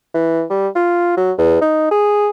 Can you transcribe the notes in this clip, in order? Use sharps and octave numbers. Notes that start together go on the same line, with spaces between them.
E3
G3
F4
F#3
E2
D#4
G#4